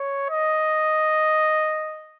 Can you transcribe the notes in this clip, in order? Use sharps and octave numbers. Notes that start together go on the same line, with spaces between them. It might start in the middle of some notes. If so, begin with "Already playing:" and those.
Already playing: C#5
D#5